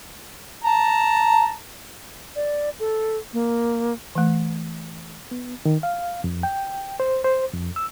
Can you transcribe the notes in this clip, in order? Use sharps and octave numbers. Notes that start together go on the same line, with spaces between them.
A5 A#5
D5
A4
A#3
E3 A3
B3
D#3
F5
F2
G5
C5
C5
F2
E6